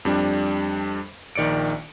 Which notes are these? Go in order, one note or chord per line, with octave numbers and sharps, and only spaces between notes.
F2 G3 D4
A#1 D#3 D5 C#7 D7